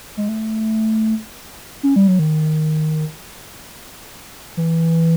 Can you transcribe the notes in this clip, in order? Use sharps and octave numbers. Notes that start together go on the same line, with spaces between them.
G#3
A3
C#4
G3
F#3
D#3
E3